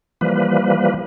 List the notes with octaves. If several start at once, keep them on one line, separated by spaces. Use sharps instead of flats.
E3 F3 G3 A#3 B4